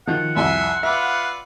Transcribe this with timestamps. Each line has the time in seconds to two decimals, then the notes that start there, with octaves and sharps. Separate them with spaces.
0.07 D#3 F3 F#5
0.37 C2 F2 E5 G#5 C6
0.83 F4 B4 D5 E5